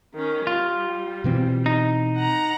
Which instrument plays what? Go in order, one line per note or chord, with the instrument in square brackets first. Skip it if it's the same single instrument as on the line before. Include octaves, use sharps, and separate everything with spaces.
[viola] D#3 C#4
[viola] G3 [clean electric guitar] F4
[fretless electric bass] B2 E3 C4
[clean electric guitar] D#4
[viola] F#5 A#5